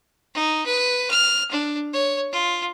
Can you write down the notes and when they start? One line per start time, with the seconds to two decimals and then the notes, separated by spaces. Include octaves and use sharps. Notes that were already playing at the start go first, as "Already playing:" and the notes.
0.34 D#4
0.66 B4
1.11 F6
1.51 D4
1.93 C#5
2.32 F4